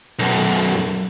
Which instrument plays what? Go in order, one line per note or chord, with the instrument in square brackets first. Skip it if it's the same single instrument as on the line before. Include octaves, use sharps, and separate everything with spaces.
[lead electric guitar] B1 F#2